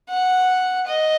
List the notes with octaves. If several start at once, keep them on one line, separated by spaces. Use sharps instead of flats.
F#5
D#5